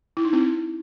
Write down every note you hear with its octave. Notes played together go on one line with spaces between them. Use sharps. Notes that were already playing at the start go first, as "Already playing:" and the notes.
E4
D#4
C4 E4